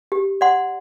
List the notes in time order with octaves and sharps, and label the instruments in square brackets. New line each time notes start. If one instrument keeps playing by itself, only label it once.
[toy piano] G4
D5 F#5 C6